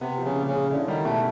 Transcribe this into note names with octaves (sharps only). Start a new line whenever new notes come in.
C3 B3
F3
C#3
A#2
C#3
G#3
D3 E4
D#3 G3
B2 A3